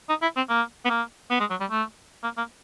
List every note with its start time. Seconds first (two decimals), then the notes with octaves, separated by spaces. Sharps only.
0.09 D#4
0.22 E4
0.36 C4
0.49 A#3
0.85 B3
0.90 A#3
1.30 B3
1.40 G#3
1.50 F#3
1.60 G3
1.70 A3
2.23 A#3
2.37 A#3